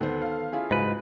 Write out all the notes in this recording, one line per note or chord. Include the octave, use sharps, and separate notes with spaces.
D2 D#3 B3 A4 C5
F5
C#4 E4 F4 G#4
C#2 G#2 F#3 B4